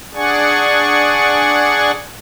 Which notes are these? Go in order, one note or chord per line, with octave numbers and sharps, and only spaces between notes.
D4 G#4 D5 F#5 G#5 C#6